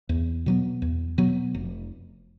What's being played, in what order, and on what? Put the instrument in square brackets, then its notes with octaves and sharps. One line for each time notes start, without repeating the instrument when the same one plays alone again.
[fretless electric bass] E2
B2 F#3 B3
E2
B2 F#3 B3
F1